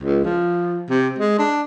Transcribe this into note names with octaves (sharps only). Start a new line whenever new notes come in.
C#2
F3
C3
G#3
D4